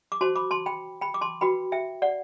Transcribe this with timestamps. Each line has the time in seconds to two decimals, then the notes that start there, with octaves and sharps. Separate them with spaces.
0.12 D6
0.21 F#4 C5 A5 C6
0.36 B5 D6
0.51 A5 C6
0.66 G5 B5
1.01 G5 B5
1.14 D6
1.21 A5 C6
1.41 F#4 B4 G5 B5
1.72 E5 G5
2.02 D5 F#5